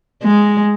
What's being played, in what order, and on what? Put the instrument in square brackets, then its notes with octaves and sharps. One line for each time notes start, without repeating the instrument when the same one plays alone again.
[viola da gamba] G#3